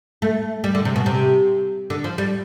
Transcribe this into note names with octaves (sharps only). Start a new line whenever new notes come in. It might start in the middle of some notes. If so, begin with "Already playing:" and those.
A3
G3
D3
C3
B2
C3
D3
F3
G3